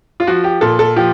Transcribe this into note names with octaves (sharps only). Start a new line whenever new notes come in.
F4
F3 F#4
G4
A#2 A4
A4
F3 G4